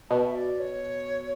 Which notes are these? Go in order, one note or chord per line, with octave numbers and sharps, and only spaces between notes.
B2 A5
E5
D5
C#5